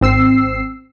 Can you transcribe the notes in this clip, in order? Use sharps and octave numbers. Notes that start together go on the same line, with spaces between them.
G#1 C4 E6 C7